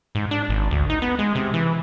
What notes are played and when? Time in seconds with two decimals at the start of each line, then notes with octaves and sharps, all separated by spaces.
0.15 G#2
0.31 D4
0.49 G#1
0.71 D2
0.90 D#4
1.02 B3
1.19 G#3
1.35 C3
1.54 E3